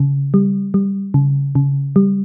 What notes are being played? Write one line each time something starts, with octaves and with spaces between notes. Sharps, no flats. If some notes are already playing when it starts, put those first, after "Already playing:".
Already playing: C#3
G3
G3
C#3
C#3
G3